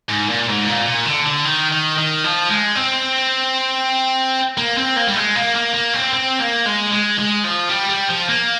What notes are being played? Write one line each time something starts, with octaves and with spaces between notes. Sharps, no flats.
G#2
A#2
G#2
A#2
A#2
D3
D3
D#3
D#3
D#3
F3
G#3
C4
A#3
C4
A#3
G3
G#3
A#3
A#3
A#3
C4
C4
A#3
G#3
G#3
G#3
F3
G3
G3
F3
A#3